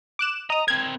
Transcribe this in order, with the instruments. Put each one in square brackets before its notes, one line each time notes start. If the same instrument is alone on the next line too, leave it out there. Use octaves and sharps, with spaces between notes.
[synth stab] D6 F#6 E7
[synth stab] D#5 D#6 [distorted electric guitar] A#5
[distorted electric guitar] C4 A#4 [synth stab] G#6